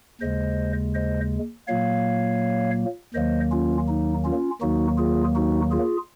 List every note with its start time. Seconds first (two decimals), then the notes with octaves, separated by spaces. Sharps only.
0.21 D#2 C#3 G#3 C5 D#5
0.94 C5 D#5
1.68 A#2 F#3 A#3 C#5 F5
3.14 D#2 D#3 F#3 A#3 C5 D#5
3.51 C#4 F4
3.88 D#4
4.24 C#4 F4
4.61 D#2 D#3 F#3 A#3 D#4 F#4
4.97 F4 G#4
5.35 D#4 F#4
5.71 F4 G#4